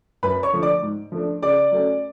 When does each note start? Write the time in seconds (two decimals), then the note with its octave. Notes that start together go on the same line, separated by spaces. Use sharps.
0.23 F#2 B4 B5
0.43 C#5 C#6
0.53 D3 F3 A3
0.62 D5 D6
0.82 G#2
1.12 F3 A3 D4
1.42 C#3 D5 D6
1.72 F#3 A3 C#4